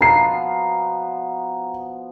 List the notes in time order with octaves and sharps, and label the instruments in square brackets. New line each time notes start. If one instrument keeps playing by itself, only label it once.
[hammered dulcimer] B2 F3 B3 [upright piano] A#5 C7